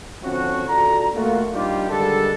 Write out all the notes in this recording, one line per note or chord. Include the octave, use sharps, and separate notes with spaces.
D3 F3 C4 C#4 E4 F#4
C#2 D4 F#4 A4 A#5
A3 A#3 F4 F#4
A#1 G3 D4 D#4 F4 G4
D3 D#3 G3 G#3 D4 A4